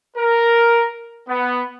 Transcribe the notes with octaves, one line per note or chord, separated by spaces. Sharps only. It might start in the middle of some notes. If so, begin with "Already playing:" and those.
A#4
B3